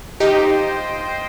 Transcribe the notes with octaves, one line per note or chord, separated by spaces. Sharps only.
D#4 F4 G4 C5 D#5 G5